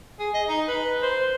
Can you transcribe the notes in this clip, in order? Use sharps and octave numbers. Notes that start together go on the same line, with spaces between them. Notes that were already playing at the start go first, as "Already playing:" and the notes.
G#4
D#5
D#4
B4
C5